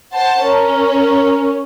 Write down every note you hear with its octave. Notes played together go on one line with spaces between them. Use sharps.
C5 F#5 A5
C#4 A#4